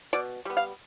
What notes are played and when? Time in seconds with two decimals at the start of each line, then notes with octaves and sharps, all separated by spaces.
0.13 B2 D5
0.45 G3 B3
0.57 F5